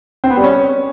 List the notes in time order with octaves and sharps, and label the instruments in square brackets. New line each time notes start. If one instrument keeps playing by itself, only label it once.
[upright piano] C4
B3
G3
C#4